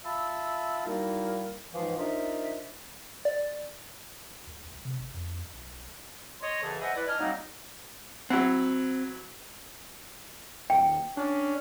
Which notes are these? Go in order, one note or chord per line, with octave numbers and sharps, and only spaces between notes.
F4 E5 F5 A5 B5 E6
G3 A#3 D#4 E4 F#4 A#4
C#2 G#2 E3 F3 F4 F5
D4 D#4 F4 A#4 C5 E5
D5
D2
C2
C3
G1
F2
B1
C#5 D#5 C6
F#2 C#3 E3 G#4 A4
B4 C5 D#5 E5 F#5 G#5
E4 B4 D5
D4 D#5 G#5 F6
F#3 G3 A#3 C4 D#4
F#3 C4 E4 F#5
D#1 G5
C#4 D4